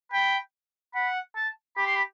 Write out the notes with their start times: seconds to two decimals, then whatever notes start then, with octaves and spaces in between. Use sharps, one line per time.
0.12 G5 B5
0.95 F#5 B5
1.36 A5
1.77 G4 B5
1.87 C6
1.96 B5